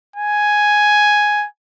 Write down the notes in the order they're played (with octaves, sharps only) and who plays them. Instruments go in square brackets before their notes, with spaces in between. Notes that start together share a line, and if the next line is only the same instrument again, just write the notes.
[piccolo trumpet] G#5